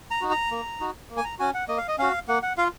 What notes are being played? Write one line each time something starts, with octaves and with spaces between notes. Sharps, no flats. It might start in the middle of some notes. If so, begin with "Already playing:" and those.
A#5
D#4 F#4
A#5
A#3
D#4 F#4
A#3
G#5
A#5
C#4 F#4 G#5
F#5
A#3 D#5
F5
D#5
C#4 F#4 F5
A#3 F#5
F#5
F4 F5